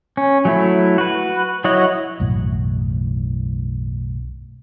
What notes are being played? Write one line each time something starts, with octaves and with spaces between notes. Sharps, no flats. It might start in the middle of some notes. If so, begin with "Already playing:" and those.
C#4
F#3 A3 E4
F#4 B4
F#3 E4 C#5 D#5 F#5
B1 F#2 A2 E3